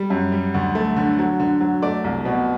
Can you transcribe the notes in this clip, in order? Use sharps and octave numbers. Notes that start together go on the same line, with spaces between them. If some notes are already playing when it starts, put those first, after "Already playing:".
Already playing: G3
F#2
G3
D2
A3
D3
F#3
D3
F#3
A3 D5
C2
B2